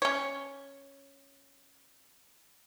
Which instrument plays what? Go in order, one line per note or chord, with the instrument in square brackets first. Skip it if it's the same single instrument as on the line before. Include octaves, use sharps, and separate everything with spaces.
[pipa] C#4 C#5